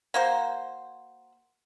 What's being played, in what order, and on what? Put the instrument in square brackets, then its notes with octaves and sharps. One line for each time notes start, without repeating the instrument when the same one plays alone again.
[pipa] A#3 F#4 C5